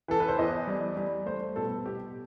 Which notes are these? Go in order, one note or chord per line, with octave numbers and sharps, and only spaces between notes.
E3 A4
B4
C5
E2 D#5
G3
G3
A3 C5
B2 A4
B2 G4